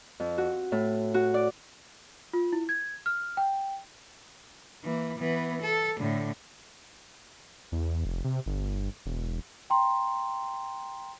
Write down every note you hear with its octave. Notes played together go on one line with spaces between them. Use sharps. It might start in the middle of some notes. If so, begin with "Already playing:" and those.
F2
F#4
A2
F#4
D5
F4
E4
G#6
F6
G5
E3 A#3
E3 B3
A4
A2 D3
E2
F1
C3
G1
E1
G5 A#5 C6